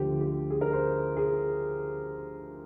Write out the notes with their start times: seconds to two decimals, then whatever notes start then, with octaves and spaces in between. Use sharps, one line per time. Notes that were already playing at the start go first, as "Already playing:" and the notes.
Already playing: D2 D3 F3 G4
0.21 G4
0.50 G#4
0.61 A#4
0.73 C5
1.17 G#4